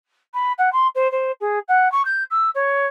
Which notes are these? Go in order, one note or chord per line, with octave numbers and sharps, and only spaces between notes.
B5
F#5
C6
C5
C5
G#4
F#5
C#6
G6
E6
C#5